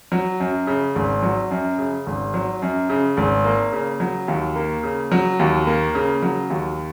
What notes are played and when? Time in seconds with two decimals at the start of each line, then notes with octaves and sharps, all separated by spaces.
0.12 F#3
0.40 F#2
0.67 C#3
0.95 G#1
1.23 F#3
1.51 F#2
1.78 C#3
2.07 G#1
2.34 F#3
2.62 F#2
2.89 C#3
3.17 G#1
3.45 A#3
3.72 C#3
4.00 F#3
4.28 D#2
4.56 A#3
4.83 C#3
5.12 F#3
5.39 D#2
5.67 A#3
5.95 C#3
6.22 F#3
6.50 D#2